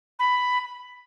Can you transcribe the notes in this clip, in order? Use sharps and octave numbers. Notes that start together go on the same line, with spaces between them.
B5